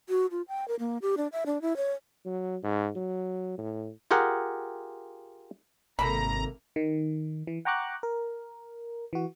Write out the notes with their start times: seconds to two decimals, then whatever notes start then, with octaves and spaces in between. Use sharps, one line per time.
0.09 F#4
0.31 F4
0.48 G5
0.68 A#4
0.79 A#3
1.02 G4
1.17 D4
1.32 E5
1.46 D4
1.62 E4
1.77 C#5
2.25 F#3
2.63 G#2
2.95 F#3
3.58 A2
4.11 F4 G4 G#4 A#4 F#5
5.99 G#1 C3 A#3 A4 A#5 B5
6.76 D#3
7.47 E3
7.65 F#5 G5 A#5 C#6 D6 F#6
8.03 A#4
9.13 E3 F#4